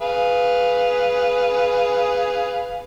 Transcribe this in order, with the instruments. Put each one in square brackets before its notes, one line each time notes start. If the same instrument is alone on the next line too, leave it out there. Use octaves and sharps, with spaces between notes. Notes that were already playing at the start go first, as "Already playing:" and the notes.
[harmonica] G#4 B4 F5